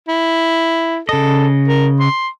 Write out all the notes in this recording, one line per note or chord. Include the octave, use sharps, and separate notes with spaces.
E4
C#3 A4 D#5
A#4
C6